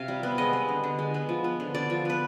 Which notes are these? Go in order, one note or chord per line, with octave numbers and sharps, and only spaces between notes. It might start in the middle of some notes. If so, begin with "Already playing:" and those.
Already playing: C3 F5
G3
B3
G#3 D#5
B3
D3
D3
G#3
B3
F3
B3
D3
D3 D5
F3
B3 B4